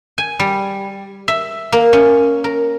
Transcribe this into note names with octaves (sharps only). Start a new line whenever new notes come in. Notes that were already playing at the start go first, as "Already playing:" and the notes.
G#5
G3
E5
A#3
C#4
A#4